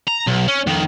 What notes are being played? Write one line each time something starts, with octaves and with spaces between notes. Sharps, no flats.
A#5
B1
C#4
F2 D#3